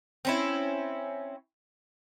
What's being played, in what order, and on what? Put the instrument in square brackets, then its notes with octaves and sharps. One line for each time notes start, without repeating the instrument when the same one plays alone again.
[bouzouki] C4 C#4 E4